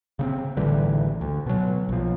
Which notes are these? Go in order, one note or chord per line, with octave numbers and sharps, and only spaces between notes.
C#3 B3 C4
A1 D3 E3 G3
D2
B2 F#3
B1 F3